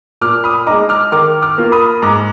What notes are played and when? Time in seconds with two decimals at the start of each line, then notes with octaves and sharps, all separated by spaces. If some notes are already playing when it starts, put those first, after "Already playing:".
0.21 A#2 D6 F6
0.44 B5 D#6
0.66 G#3 D#4 A#5 D6
0.89 D6 F6
1.12 D#3 D6 F6
1.42 D6 F6
1.58 A#3 F4
1.72 B5 D#6
2.02 G#2 A#5 D6